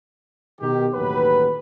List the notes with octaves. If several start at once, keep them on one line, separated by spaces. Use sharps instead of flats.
B2 D#3 G4
A1 D#2 F#3 G4 B4